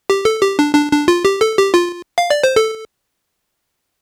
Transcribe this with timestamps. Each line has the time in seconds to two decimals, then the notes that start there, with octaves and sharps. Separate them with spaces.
0.10 G4
0.25 A4
0.42 G4
0.59 D4
0.75 D4
0.92 D4
1.08 F4
1.25 G4
1.41 A4
1.58 G4
1.74 F4
2.18 F5
2.30 D5
2.44 C5
2.56 A4